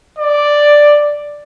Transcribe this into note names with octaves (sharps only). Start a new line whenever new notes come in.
D5